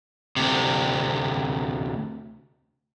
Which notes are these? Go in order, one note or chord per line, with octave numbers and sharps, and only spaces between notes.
D2 C3